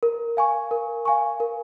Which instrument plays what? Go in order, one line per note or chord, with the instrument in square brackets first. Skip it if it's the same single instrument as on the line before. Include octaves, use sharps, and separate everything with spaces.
[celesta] A#4
F5 G#5 C#6
A#4
F5 G#5 C#6
A#4